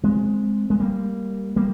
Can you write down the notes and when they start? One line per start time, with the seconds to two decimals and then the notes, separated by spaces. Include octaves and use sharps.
0.03 G#3 C4
0.70 G#3
0.80 G3 A#3
1.56 G3 A#3